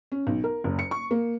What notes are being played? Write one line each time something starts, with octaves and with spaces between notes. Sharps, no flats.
C#4
B1
A#4
F#1
C#7
C#6
A#3